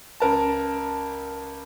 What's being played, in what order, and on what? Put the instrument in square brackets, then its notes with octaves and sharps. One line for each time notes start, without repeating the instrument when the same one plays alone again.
[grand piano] C#2 A#4 A5